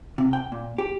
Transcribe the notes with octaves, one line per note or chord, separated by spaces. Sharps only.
C3
G5
A#2
G4